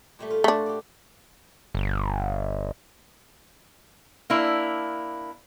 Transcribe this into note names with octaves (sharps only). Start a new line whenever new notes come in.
A#2 G3 A3
F4
A3 D4 F#4 C5
G4 D5
G1
A#3 D4 E4